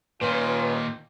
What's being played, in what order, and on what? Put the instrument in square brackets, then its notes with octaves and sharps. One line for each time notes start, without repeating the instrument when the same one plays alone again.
[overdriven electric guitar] A#2 D#3 [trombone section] C#4 D#4 F4 [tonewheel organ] B4